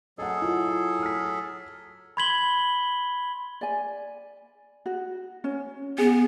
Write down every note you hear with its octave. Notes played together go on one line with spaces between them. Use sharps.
F#3 G#4 A4 D#5 F#5
E4 F4
F6 B6
B5 C6 G#6 B6 F#7 G7
D5 G#5
F#4
C#4
B3 G#4